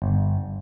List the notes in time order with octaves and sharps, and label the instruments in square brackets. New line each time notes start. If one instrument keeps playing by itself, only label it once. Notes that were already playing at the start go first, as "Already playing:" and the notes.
[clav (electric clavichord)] G1